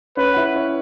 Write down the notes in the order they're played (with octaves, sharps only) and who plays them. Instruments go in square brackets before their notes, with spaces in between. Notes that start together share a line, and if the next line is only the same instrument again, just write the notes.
[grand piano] C#4 C#5 [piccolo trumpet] B4
[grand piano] F#5
E4 E5
C#4 C#5